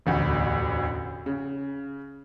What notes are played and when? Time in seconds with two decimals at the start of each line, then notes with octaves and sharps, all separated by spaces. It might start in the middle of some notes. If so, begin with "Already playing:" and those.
0.06 E1 A1 D2 A2
1.26 C#3